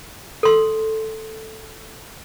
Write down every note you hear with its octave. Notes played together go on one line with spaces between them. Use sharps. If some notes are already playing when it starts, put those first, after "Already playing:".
A4 C6